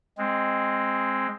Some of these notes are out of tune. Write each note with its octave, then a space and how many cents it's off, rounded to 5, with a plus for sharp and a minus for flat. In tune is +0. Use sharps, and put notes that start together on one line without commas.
G#3 -5 C4 +10